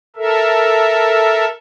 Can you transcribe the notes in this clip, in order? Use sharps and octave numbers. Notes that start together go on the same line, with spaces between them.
A4 A#4 E5